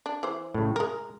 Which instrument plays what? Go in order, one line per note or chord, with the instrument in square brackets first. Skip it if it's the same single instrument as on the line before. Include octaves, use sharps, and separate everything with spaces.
[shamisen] D4
E3 C5
[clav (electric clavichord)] A2 C#3
[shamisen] G#3 A#4 [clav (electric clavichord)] A#5